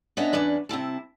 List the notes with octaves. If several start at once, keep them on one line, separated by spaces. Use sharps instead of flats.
B3 C#4 D4 C#5 D#5 E5
E2 C#4 D4 B4
C3 C4 E4 A5